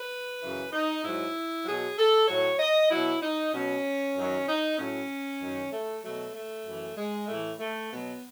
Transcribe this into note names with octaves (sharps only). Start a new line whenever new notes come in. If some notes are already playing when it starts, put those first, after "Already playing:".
Already playing: B4
F#2 C#3 E3
D#4
G#2 F#3 E4
B2 F#3 G#4
A4
A2 F#3 C#5
D#5
B2 F#3 E4
D#4
B2 F#3 C#4
F#2 D#3 F#3
D#4
A2 F#3 C#4
F#2 D#3 F#3
A3
B2 F#3 A3
A3
F#2 E3
G#3
A2 E3 A3
A3
B2 F#3 B3